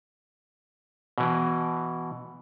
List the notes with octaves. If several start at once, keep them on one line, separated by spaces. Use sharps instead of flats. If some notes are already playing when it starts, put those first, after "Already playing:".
B2 E3